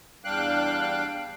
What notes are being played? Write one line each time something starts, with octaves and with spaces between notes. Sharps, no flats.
E2 G3 D4 F5 G5 F#6